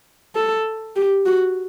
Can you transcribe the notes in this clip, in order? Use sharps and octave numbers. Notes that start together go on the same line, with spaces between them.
A4
G4
F#4